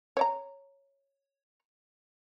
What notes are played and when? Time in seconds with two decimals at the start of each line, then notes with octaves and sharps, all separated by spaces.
0.17 C#5 D5 A#5